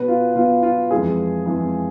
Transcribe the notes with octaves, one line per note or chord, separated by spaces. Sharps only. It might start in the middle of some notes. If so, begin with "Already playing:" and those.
Already playing: B2 B3 B4
F4
B2 B3 F4
F4
F2 E3 G#3 G#4
F2 E3 G#3